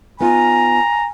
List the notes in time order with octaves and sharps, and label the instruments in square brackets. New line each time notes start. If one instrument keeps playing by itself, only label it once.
[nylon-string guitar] B3 D#4 F4 [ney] G#5 [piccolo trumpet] A#5